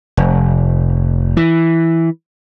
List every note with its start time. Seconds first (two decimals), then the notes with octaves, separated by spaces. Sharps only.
0.17 F1
1.37 E3